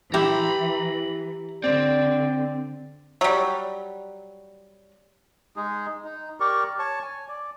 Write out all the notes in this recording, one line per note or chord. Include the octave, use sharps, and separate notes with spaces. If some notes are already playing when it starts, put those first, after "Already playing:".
E3 E4 G4 A#5 B5
D3 C4 D5
F#3 G3
G#3 D#4 G#4
D#4
G4 A#4 D5 C#6
C#5 A5 C#6
G#5
D5